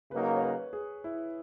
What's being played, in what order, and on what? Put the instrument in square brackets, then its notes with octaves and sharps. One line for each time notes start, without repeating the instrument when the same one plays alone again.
[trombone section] C#3 F#3 A#3 D#4 [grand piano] B4
[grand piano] C#5
B4
G#4
E4